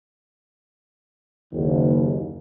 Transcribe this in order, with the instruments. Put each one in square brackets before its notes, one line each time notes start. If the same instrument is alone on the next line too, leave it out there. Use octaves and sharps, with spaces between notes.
[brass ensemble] F#1 D#2